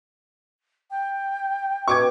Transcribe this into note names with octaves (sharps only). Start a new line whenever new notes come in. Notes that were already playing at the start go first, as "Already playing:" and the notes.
G5
B2 C#6 D6 G#6